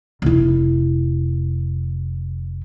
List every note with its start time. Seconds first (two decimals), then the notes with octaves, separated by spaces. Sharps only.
0.22 F1 E4